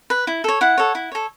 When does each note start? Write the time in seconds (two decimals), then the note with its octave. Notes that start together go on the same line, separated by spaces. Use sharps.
0.10 B4
0.27 E4
0.44 A4 C#5
0.61 E4 F#5
0.78 A4 C#5
0.95 E4
1.12 A4 C#5